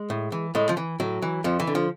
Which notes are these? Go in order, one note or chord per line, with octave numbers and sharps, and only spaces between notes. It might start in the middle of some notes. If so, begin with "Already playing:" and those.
Already playing: G#3
A2
E3
A2 G#3
F3
E3
A2 F#3
E3
F2 F3
E3
D3
F3